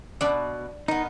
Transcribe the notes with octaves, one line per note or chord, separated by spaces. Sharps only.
B2 D4 D5 E5
D#3 B3 D#4